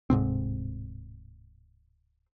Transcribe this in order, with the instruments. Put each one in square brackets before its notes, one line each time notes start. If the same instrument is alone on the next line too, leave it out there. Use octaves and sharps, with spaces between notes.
[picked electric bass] D1 G#2 C3 C4